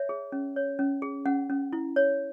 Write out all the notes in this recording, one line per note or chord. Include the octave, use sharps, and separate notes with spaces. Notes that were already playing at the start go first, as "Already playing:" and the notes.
Already playing: C#5 E5
G#4
C#4
C#5
C#4
G#4
C#4 F#5
C#4
E4
C#5